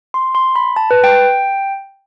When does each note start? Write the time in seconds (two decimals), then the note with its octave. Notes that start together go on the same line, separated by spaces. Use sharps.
0.14 C6
0.35 C6
0.56 B5
0.76 A5
0.91 B4
1.04 G5